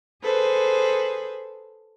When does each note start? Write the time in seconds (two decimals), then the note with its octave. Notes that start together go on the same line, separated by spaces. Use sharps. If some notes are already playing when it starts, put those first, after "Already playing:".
0.22 G#4 A4 B4 C5